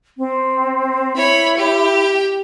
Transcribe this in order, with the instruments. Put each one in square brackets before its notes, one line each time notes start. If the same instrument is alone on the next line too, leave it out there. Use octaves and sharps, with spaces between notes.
[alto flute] C4
[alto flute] E4 [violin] C#5 B5
[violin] G4